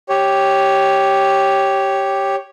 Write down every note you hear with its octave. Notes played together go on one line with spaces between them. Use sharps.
G4 C#5